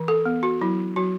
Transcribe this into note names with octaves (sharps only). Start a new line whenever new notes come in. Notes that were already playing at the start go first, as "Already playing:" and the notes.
Already playing: E3
A4
B3
F#4
F#3 E4
F#3 F#4